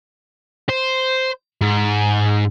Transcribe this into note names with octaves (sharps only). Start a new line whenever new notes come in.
C5
G#2